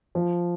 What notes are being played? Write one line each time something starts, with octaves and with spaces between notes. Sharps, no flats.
F3